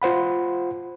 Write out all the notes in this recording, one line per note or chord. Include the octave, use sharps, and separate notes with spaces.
F4 C5 F#5 B5